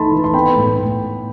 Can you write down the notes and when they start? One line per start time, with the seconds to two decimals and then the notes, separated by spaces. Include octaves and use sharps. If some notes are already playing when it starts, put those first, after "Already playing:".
Already playing: E3 A3 D#4 A5 B5 C6
0.11 E3
0.24 C6
0.34 B3 G5 B5
0.57 A2
0.79 A2